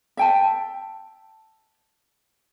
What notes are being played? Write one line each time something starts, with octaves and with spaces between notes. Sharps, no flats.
E5 G5 A5